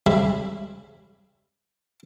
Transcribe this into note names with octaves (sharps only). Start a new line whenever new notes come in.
C#3 G3 G#3 C4 E5 B5